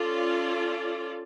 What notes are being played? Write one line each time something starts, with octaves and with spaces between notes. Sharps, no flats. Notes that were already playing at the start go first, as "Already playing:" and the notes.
Already playing: C#4 F4 A4 D5